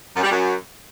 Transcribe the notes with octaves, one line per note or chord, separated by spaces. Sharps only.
F#2
G3
F#2